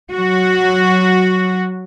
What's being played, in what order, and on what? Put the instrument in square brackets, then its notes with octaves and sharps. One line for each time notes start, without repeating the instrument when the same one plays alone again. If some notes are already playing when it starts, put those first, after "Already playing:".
[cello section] F#3 F#4